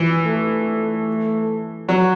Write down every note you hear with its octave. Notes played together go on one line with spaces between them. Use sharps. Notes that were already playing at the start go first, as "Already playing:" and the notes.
Already playing: E3
A3
F#3